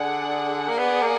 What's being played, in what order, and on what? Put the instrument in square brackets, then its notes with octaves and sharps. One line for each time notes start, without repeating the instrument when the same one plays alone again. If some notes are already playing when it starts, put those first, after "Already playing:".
Already playing: [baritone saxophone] D3 [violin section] G#4 D5 F#5
[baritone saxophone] A#3
[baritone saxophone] B3 [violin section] G#4 D5 F#5
[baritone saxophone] A#3